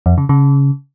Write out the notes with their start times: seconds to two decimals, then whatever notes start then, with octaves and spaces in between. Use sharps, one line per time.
0.06 F2
0.18 C#3
0.29 C#3